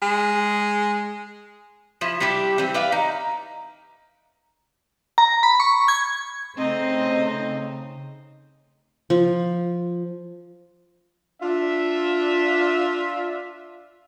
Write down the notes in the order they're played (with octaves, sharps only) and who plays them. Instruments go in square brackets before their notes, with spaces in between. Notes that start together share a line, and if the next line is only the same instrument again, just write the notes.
[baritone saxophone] G#3
[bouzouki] F3 E4
G3 D4 E4 G4
E3 C4
B4 D5 E5 F5
D#4
[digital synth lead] A#5
B5
C#6
G#6
[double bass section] C#3 [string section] A3 D#4 [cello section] C4 [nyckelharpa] C5 D#5
[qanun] F3
[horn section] D4 F4 E5